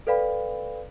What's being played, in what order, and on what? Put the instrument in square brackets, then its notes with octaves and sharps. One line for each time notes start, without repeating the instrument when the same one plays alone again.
[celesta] A4 B4 D5 F5 G5 B5